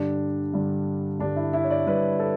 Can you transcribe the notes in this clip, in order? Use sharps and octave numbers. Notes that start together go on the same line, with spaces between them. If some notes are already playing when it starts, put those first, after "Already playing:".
Already playing: G2 D3 G3 D4
G2 D3 G3
G2 D3 G3 D4
E4
E4
C#5
D5
G2 D3 G3 B4
A4